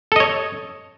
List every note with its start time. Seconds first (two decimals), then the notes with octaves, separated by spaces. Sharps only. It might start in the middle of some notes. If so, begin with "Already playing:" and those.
0.12 A4
0.16 D#5
0.20 C#5